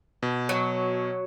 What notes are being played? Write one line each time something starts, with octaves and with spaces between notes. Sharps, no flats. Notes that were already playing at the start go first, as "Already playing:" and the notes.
B2
F#3